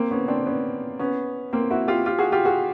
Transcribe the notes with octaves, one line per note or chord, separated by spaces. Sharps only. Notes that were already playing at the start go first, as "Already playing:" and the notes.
Already playing: A#3 C4
B3 C#4
C4 D4
B3 C#4
B3 C#4
A#3 C4
E4 F#4
F4 G4
F4 G4
F#4 G#4
F4 G4
F#4 G#4